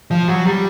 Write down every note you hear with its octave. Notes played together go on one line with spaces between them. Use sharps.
F3
F#3
G3